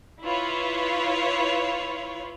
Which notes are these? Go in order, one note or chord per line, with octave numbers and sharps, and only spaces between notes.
E4 F4 B4 C#5